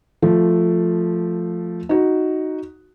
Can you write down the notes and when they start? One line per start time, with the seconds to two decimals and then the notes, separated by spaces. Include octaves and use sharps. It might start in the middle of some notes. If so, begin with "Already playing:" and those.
0.22 F3 A3
1.89 D#4 F#4